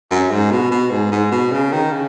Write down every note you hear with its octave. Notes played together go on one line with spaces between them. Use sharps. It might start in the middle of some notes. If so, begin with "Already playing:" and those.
F#2
G#2
B2
B2
G#2
G#2
B2
C#3
D#3
C#3